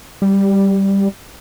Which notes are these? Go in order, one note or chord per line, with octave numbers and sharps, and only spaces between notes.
G3